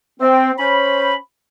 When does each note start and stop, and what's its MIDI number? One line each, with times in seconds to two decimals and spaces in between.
0.20 0.51 60
0.58 1.13 61
0.58 1.13 72
0.58 1.13 83